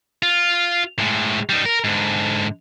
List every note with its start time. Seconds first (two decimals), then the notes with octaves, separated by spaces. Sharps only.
0.23 F4
0.99 A2 G#3
1.49 G3 D#4
1.65 A#4
1.84 G#2 D3